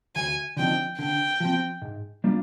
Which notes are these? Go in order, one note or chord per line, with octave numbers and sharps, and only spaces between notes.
D2 G#5
D3 F3 C4 D#4 G5
D3 G5
F3 C4
G#2
G3 A#3 D4 F4